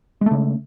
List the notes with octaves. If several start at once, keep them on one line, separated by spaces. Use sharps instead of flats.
C#3 G#3 A3